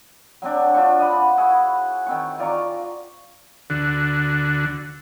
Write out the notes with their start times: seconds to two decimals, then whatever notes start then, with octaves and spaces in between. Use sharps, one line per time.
0.42 F#3 C4 D4
0.74 D4 F4 C5 C#6
0.99 D#5 F#5 B5
1.37 E4 F#4 G#4
2.06 D#3 C4 C#6
2.39 F4 D5 A#5 C#6
3.70 D2 D3 F#4